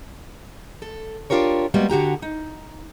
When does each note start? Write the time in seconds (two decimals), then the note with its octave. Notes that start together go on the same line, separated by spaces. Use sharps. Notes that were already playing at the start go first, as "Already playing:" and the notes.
0.82 A4
1.30 D4 F4 G4 A#4 C#5
1.74 G3 G#3 A#3 B3 F#4
1.90 D3 F#4 G4 A#5
2.22 D#4